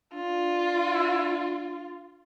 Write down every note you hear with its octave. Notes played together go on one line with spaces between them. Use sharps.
D4 F4